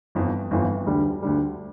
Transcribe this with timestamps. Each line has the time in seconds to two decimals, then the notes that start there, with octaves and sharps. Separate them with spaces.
0.15 G1 F2 E3
0.51 G1 F2 E3
0.86 D2 D3 G3
1.22 D2 D3 G3